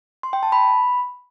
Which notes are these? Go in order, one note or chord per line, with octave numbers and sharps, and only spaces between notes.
C6
G5
A5
B5